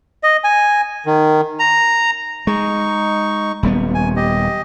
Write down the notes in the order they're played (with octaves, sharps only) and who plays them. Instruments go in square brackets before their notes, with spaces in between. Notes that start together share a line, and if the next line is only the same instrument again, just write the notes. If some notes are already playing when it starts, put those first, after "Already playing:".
[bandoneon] D#5
G#5
D#3
A#5
[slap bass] G#3 [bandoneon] D#4 C#6
[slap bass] D#1 G3 B3
[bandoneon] G#5
G4 D#5